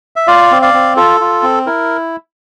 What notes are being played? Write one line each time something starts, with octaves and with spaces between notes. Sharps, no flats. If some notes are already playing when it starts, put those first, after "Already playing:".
E5
F4 D5 F5
C4
D5 F5
C4
F4 A4
F4
C4
E4 A#4